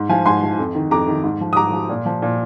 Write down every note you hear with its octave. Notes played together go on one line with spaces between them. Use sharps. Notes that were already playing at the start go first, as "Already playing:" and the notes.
Already playing: G#2
F3 F5 G#5
G#2 G#5 C6
F3
F2
D#3
F2 A#5 D6
D#3
G#2
F3
D#6
G#2 A#5 D6
F3
A#2
F3
A#2